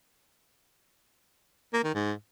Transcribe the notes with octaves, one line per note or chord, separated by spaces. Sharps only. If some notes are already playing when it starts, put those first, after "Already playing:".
A#3
D#3
G#2